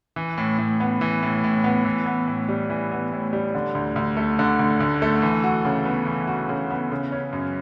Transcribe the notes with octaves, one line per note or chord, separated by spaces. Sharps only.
E3
A2
A2
B3
E3
A2
A2
B3
E3
B3
A2
G3
E3
B3
A2
G3
D3
D2
D2
A3
D3
D2
D2
A3
E3
F#4
C#3
B3
E3
F#4
C#3
B3
C#3
C#4
F#2